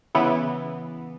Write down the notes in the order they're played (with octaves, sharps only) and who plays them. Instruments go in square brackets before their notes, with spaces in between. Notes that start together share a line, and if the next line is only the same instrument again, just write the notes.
[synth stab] C#3 E3 B3